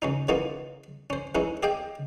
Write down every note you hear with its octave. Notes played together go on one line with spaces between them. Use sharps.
C#2 C#4 D#4
C#3 E3 A#3 B3 D#4 F4
C#4 C5
E3 G#3 C#4 D#4 E4
G4 G#4 D#5 F5 G5